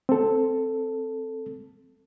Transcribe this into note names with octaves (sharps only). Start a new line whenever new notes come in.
C4 A4